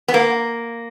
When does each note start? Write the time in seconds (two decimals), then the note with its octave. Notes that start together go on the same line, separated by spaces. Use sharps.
0.08 B3
0.14 A#3